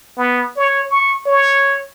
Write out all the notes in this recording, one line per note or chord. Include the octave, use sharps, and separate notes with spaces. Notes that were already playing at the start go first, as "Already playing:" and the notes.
B3
C#5
C#6
C#5